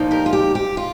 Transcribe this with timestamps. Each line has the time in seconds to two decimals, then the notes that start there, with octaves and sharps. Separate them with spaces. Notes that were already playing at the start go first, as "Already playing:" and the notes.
Already playing: A#2 F3 A#3 D#4
0.11 G4 A#4
0.26 F4
0.33 G4
0.55 G4
0.77 F4